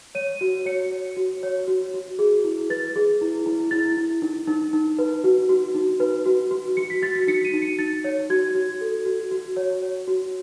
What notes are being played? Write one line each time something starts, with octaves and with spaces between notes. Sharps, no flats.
C#5 D#7
F#4
C#5 C#7
C#5
F#4
C#5
F#4
F#4
G#4
E4
B4 A6
G#4
E4
E4
E4 A6
E4
D#4
D#4
D#4
B4
F#4
F#4
D#4
B4
F#4
F#4
F#4 C#7
B6
F#4 A6
B6
D#4 C#7
D#7
D#4
C#7
D#4 A6
C#5
F#4 G#6
F#4
A4
F#4
F#4
C#5
C#5
F#4